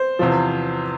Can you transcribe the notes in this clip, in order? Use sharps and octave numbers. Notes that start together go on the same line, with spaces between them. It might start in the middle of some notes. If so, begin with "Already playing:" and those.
Already playing: C5
E2 C3 F3